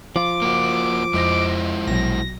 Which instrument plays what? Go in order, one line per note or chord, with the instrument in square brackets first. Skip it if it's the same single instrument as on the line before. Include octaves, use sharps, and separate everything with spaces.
[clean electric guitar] F3 F4 [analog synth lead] D6
[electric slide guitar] A#3 F#4
[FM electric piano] F2 D#5 A#6 [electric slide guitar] G#3 E4 C5
[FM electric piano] A#1 B2 F#3 [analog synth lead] A#6